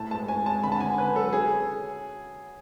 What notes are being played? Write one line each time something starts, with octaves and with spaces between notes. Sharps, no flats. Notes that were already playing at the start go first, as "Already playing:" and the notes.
Already playing: A2 A5
G#3 A5
C#4 G#5
G#3 A5
D3 B5
A5
D3 G#5
C#4 B4
F#3 A4
C#4 G#4